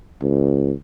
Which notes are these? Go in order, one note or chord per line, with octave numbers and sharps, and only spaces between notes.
C#2